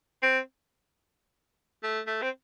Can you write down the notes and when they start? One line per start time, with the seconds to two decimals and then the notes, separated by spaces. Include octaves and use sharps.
0.22 C4
1.83 A3
2.07 A3
2.22 C4